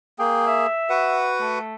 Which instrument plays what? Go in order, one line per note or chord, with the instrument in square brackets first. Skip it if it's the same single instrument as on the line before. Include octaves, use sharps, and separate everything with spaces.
[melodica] A#3 G#4 [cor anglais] G5
[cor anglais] E5
[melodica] F#4 B4 F#5
[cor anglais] A3